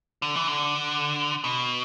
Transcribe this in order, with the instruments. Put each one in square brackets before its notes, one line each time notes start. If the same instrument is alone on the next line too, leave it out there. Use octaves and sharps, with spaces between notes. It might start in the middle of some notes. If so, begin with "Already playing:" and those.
[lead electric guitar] D3
E3
D3
B2